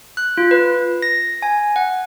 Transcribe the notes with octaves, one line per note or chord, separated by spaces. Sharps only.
F#6
F4
B4
A#6
G#5
F#5